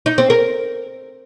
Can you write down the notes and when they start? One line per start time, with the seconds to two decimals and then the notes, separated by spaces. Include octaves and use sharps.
0.06 D#4
0.18 C4
0.30 A#4